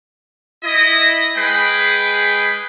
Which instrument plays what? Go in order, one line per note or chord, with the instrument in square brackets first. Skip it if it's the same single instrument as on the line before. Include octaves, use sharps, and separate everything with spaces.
[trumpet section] E4 D#5
G#3 G#4 B4 G5 B5